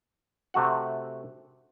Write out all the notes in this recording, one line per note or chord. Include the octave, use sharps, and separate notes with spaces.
C3 A3 F#4 F#5